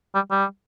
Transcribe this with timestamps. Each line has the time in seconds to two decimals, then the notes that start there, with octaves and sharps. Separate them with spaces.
0.15 G3
0.31 G3